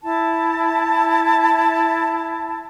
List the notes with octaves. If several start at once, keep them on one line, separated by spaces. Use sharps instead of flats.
E4 A5